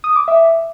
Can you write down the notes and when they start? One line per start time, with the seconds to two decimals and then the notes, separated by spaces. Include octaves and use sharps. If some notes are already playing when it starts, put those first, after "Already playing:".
0.04 D#6
0.16 D6
0.28 E5